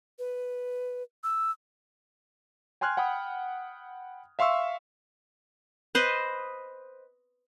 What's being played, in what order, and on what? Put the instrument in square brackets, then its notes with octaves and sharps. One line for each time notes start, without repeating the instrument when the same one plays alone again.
[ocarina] B4
E6
[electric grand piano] G5 G#5 C6 F6 F#6 G#6
F#5 G5 B5 D#6
E5 F5 C6 C#6 E6
[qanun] B4 C5 D#5